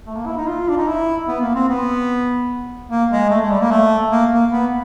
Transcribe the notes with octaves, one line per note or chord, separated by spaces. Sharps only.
A3
A#3
E4
D#4
F4
D4
D#4
E4
B3
A#3
C4
B3
A#3
G#3
A3
G#3
G3
A#3
A3
A#3
A#3
B3